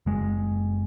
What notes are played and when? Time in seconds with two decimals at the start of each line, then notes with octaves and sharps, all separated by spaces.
0.06 F#1 G#3